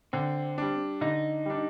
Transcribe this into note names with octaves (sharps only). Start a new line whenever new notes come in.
D3 C4
G3 D4
D3 D#4
G3 D4